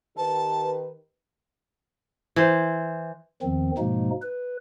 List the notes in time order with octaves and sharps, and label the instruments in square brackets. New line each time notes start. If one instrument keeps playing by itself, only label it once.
[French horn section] D#3 G4 B4 [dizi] A5
[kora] E3 C5
[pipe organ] E2 D#3 F3 C4
G#2 B2 F3 G#3 A#3 D#4
B4